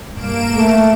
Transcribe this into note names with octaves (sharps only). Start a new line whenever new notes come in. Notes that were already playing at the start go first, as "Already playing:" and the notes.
G2 A#3 D7 E7
A3